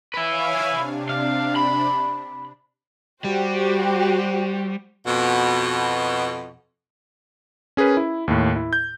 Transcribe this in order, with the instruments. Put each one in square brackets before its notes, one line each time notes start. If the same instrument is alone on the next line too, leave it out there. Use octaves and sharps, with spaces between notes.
[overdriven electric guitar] E4 B4 [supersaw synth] C#5 F5 G#5
[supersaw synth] C3 D4
[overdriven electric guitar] F5
B5
[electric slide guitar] G3 [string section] F#4 G4 C5
[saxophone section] F2 B2
[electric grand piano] C#4 G#4 A#4 B4
E4
D#2 A2
E4
G6